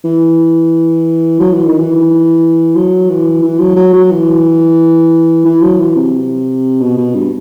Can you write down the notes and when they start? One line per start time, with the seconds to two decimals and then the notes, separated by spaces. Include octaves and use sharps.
0.05 E3
1.40 F#3
1.53 E3
1.66 D#3
1.79 E3
2.75 F#3
3.09 E3
3.42 E3
3.59 F#3
3.76 F#3
3.93 F#3
4.11 E3
5.45 E3
5.62 F#3
5.79 E3
5.96 C3
6.81 B2
6.97 B2
7.15 G2